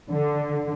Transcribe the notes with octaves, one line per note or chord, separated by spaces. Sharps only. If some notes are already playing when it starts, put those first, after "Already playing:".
D3